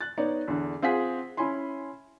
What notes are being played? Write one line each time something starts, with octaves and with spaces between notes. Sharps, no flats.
F#6 A6
B3 D#4 C#5 D5
E2 D3
C4 F4 G#4 F#5 B6
C#4 E4 C#5 G#5 B5 C6